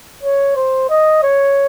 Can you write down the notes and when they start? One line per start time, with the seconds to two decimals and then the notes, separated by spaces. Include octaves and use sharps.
0.23 C#5
0.56 C5
0.90 D#5
1.23 C#5